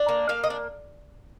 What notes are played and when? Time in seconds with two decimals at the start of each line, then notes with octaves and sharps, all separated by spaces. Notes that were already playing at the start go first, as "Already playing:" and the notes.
Already playing: D4
0.09 A#3
0.29 A#3 F5
0.44 D#5
0.50 D4